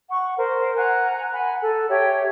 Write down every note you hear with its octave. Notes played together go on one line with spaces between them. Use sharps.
F#5 C#6
A#4 C5
F#5 G#5 A#5 F#6
F#5 G#5 B5
A4
G4 C#5 E5 G5